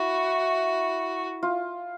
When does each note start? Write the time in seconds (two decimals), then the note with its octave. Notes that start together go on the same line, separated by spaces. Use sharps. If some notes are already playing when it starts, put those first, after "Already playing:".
Already playing: E4 F#4
1.43 F4